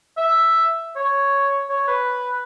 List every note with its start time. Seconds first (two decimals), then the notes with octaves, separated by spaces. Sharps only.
0.17 E5
0.96 C#5
1.69 C#5
1.87 B4